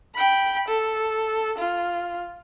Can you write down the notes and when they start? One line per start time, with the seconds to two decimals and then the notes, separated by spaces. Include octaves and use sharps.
0.15 G5 B5
0.69 A4
1.59 F4